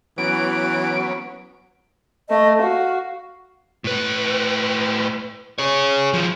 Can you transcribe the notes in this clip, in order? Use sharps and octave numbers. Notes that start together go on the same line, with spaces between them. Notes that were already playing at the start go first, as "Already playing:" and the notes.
E3 F#3 B3 C#4 D7
A3 D#5
F#4 F5
A2 B4
G#4 C#5
D#3 F3